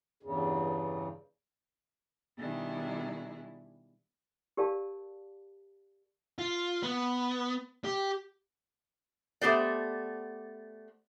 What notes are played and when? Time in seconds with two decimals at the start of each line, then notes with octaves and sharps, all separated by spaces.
0.23 E2 G2 C#3
2.38 B2 D#3 G3 D4 E4 G#4
4.57 G4 A#4 D5 F5 A5
6.38 F4
6.83 B3
7.84 G4
9.41 A3 B3 G4 C5 D5